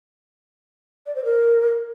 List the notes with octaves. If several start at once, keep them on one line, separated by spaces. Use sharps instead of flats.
D5
C5
A#4